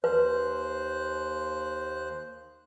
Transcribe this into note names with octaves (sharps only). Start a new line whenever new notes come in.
D#2 B4 C5 F#6